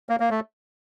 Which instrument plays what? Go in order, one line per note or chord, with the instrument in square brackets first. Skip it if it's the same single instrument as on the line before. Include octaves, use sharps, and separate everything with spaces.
[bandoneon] A#3
A#3
A3